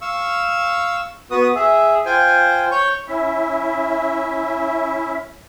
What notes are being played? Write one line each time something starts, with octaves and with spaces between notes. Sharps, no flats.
F5 C#6 E6
B3 F#4 B4 D#6
G#4 E5
F4 C5 G5 G#5
C#5 C#6 G6
C#4 E4 E5